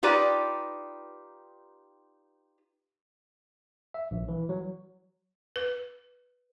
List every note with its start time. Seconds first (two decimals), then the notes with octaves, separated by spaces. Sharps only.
0.03 D#4 F4 G4 B4 D5
3.94 E5
4.11 A#1
4.28 E3
4.49 F#3
5.56 B4